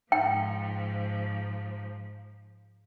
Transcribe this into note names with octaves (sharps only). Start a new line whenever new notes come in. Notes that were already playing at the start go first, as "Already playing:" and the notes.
G#2 F3 G5